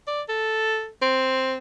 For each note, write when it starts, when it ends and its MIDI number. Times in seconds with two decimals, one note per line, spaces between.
0.07 0.22 74
0.29 0.88 69
1.02 1.57 60